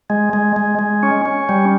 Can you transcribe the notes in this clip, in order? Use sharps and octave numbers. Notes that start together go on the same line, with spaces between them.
G#3
G#3
G#3
G#3
C#4
C#4
G3